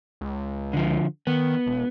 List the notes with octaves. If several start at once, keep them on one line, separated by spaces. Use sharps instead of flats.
C#2
D3 F3
D#3 B3
E1